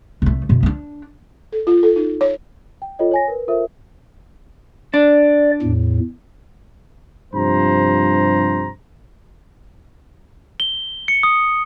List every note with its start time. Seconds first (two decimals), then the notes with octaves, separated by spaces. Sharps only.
0.22 C2 A3
0.49 F#2 B2
0.63 C4 D4
1.52 A4
1.67 F4
1.83 A4
1.96 D#4
2.21 C#5
2.82 G5
2.99 F4 A4 C#5 D#5 G5
3.11 C#5 G#5 A#6
3.28 A#4 B4
3.48 F4 A4 A#4 C5 E5
4.94 D4 D5
5.62 E2 A2
7.34 G2 C3 F3 C5 A#5
10.60 G7
11.08 C#7
11.23 D#6